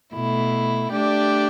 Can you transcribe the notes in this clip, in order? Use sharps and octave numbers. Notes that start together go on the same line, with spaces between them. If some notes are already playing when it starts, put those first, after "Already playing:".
B2 A3 E4
A3 D4 G4 D5